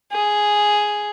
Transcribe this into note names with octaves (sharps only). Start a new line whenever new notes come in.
G#4